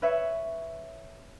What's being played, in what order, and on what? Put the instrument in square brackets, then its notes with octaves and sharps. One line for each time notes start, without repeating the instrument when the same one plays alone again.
[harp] B4 C#5 E5